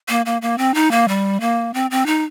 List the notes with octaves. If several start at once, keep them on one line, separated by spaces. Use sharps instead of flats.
A#3
A#3
A#3
C4
D#4
A#3
G3
A#3
C4
C4
D#4